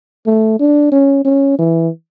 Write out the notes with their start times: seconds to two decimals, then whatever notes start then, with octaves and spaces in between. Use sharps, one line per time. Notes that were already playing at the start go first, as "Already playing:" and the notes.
0.26 A3
0.60 D4
0.92 C#4
1.25 C#4
1.59 E3